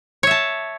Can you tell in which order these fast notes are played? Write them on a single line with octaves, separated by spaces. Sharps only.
C#5 E5 A5